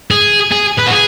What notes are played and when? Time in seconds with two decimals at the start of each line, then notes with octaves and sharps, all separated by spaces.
0.11 G#4
0.51 G#4
0.78 B4
0.87 F#4
0.91 G#4